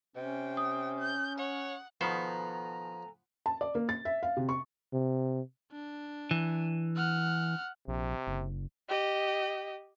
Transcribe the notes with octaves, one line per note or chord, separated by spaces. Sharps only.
C3 C#4 G5
D#6
G6
C#5 F#5
B2 D#3 F3 B3 A4 C5 G#5 A#5
A5
D5
A#3
A6
E5
F5
C3
C#6
C3
D4
E3
F#5 F6
A#1 C3
F#1
G4 D#5